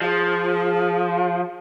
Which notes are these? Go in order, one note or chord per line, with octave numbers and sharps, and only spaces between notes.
F3 G#4